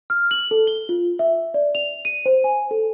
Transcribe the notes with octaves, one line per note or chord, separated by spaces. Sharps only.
F6
F#7
A4
G7
F4
E5
D5
F7
D#7
C5
G#5
A4